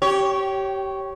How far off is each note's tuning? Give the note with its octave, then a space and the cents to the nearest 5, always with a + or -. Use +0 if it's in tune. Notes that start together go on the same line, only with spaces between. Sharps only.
G4 -20 C#5 +0